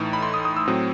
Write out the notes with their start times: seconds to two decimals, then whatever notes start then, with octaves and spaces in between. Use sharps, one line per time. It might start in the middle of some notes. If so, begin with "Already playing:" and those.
Already playing: A2 E3 A3 D#4
0.13 B5
0.23 C6
0.34 D#6
0.45 D#6
0.57 E6
0.68 A2 F#3 C4 D#6